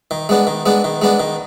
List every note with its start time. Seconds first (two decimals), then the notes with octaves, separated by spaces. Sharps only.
0.11 D#3
0.29 G#3 B3 D4
0.47 D#3
0.66 G#3 B3 D4
0.84 D#3
1.02 G#3 B3 D4
1.20 D#3